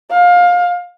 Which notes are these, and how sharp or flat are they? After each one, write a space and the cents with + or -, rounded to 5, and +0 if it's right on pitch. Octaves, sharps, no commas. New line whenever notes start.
F5 +25